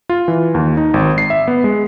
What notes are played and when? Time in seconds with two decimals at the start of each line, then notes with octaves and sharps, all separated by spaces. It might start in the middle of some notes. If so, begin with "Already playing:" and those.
0.09 F4
0.28 E3
0.55 D#2
0.77 D#4
0.94 G#1
1.18 C7
1.30 E5
1.48 B3
1.64 G#3